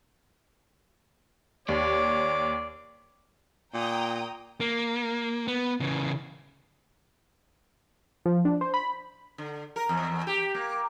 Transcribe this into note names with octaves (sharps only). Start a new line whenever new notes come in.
D#2 C#5 D5 D6
A#2 G5 A#5 D#6
A#3
B3
C#3 E3
F3
D4
C5
B5
D3
A#4
E2
G4
A#3